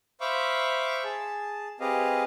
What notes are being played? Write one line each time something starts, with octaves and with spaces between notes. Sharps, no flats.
C5 E5 F5 B5 C#6 D6
G#4 A5
C4 G4 G#4 B4 D#5 F5